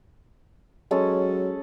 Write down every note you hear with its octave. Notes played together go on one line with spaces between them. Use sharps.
F#3 G#3 C#4 A4